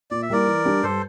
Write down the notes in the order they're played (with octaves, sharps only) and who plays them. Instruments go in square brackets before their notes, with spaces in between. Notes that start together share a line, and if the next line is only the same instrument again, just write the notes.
[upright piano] A#2 [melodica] D5
[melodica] E5
[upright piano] G3 A#3 E4 [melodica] A#4 D5
[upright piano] E3
G3 D4 G4
[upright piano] G2 [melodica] A4 C5